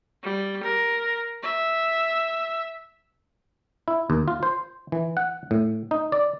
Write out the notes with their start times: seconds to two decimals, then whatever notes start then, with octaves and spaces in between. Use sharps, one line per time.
0.23 G3
0.63 A#4
1.42 E5
3.88 E4
4.10 D#2
4.28 F4
4.43 C5
4.92 E3
5.17 F#5
5.51 A2
5.91 D#4
6.12 D5